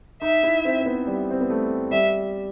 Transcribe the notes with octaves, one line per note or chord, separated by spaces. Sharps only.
D#4 E5
E4
C4
C4
B3
G3
C4
B3
A3
G3 E5